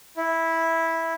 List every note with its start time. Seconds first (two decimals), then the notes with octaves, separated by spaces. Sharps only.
0.17 E4